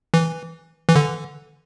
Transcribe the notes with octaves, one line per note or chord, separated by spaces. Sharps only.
E3
E3
D3